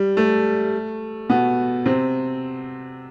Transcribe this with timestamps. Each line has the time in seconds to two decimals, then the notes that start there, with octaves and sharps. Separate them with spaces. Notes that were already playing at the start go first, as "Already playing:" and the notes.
Already playing: G3
0.17 A3
1.29 B2 B3
1.86 C3 C4